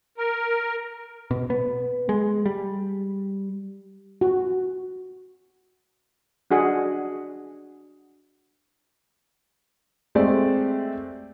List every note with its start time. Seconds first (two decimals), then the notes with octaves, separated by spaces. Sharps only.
0.18 A#4
1.31 B2
1.50 B3
2.09 G#3
2.46 G3
4.21 F#4
6.51 D4 F#4 G#4 F#5
10.15 G#3 A3 C4 G4 D5